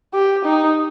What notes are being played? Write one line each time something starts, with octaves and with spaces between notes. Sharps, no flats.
G4
D#4